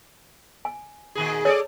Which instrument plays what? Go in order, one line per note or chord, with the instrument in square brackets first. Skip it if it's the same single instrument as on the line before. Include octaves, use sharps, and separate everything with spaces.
[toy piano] G#5
[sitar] A#2 D#3 G#4
[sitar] G#4 A4 D5 [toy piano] C#5